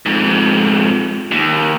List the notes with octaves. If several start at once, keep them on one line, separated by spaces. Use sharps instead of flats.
F2 G#2
D#2